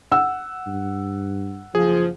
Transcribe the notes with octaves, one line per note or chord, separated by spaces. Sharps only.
F#5 E6
G2
F#1 F3 G#4